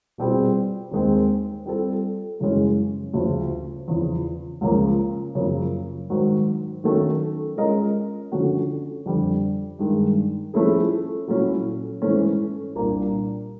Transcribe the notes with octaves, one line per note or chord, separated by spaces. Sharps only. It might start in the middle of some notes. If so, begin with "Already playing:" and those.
B2 G3 C4 F4 G#4
D#2 D#3 G#3 C4
G3 C4 F4 A4
F#2 C#3 E3 G#3 C#4
D2 C#3 F3
E2 C#3 F3
C#2 C#3 F3 A#3 C#4
F#2 C#3 F3 A#3
G#2 D#3 F#3
D#3 F#3 A3 C#4
G#3 C#4 F4 A#4 D#5
D3 F3 A3 C#4 F#4
F2 D3 G3
G2 D#3 G#3
F3 A3 C#4 E4 G#4
A#2 F#3 A3 C#4 E4
G#2 E3 A3 C#4
C2 A#2 G3 A#3 D4